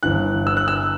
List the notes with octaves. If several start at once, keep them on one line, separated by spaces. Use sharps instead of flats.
G1 G2 E3 F#6
E6
F#6
E6